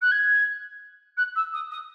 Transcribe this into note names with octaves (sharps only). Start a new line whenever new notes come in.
F#6
G#6
F#6
E6
D#6
D#6